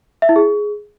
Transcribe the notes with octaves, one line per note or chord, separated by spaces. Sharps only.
E5
E4
G#4